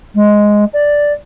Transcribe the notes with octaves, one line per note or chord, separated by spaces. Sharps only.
G#3
D5